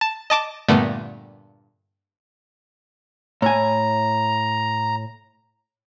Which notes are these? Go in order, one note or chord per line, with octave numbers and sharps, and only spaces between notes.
A5
D#5 A5 D6
G2 A#2 D3 A3 B3
A2 G#5 A#5